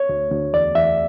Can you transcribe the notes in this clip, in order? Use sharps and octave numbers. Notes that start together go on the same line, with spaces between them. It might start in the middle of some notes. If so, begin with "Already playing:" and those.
Already playing: C#5
D2
D2
E2 D5
E2 E5